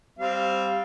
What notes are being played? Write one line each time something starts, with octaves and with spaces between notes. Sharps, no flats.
G3 C4 F5